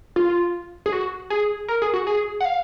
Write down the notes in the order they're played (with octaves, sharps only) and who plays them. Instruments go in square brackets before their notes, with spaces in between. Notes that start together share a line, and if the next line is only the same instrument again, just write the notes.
[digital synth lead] F4
G#4
F#4
G#4
A#4
G#4
F#4
G#4
F#5
F5